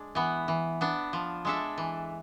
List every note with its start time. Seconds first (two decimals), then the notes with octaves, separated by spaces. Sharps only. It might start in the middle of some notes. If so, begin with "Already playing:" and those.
Already playing: G#3 D4
0.15 E3 B3
0.48 E3
0.81 B3 D4
1.13 F3
1.45 G#3 D4 A4 E5
1.78 E3